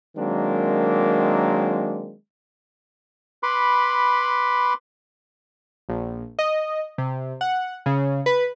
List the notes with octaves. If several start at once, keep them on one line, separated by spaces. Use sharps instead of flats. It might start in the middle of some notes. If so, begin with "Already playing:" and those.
D#3 F#3 G#3 A#3 C4 D4
B4 B5 C6 D6
A#1
D#5
C3
F#5
C#3
B4